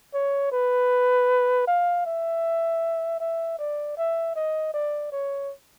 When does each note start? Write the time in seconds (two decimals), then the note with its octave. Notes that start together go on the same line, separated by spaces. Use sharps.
0.14 C#5
0.52 B4
1.67 F5
2.06 E5
3.20 E5
3.59 D5
3.97 E5
4.36 D#5
4.74 D5
5.12 C#5